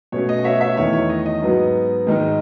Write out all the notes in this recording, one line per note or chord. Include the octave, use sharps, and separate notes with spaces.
B2 A3 C#4 C#5
D#5
C#5 E5
C#5 E5
E2 D#3 A3 C#5
C#5
D#5
D#5
G#2 F#3 B3 D#4
G#2 D#3 G#3 D#4